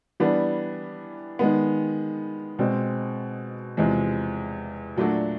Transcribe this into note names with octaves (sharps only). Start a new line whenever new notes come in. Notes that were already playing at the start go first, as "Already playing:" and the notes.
E3 G3 B3 D4
D#3 G#3 B3
B2 G#3 C4
E2 C3 F3 G#3
A#2 F#3 A3 D4 F#4